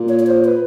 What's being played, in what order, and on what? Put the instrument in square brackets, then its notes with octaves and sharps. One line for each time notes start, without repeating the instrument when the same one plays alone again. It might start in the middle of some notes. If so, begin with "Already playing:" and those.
Already playing: [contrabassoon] A#2
[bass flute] C#5
C#5
C5
B4